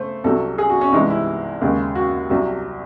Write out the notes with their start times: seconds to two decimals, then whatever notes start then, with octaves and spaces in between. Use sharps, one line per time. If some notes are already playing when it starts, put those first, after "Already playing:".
Already playing: C#3 A3 C5
0.24 C2 C3 F#3 A4
0.58 G#4
0.69 F#4
0.81 C#4
0.92 C2 C3 E3 G#3 D#4
1.10 E4
1.61 D#2 C#3 G#3
1.95 F#4
2.30 C2 C3 F#3